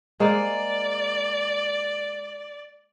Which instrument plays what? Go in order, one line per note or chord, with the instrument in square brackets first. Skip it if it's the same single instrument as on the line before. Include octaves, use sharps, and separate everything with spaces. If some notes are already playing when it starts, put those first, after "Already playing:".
[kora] G#3 A#3 C5 [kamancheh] D5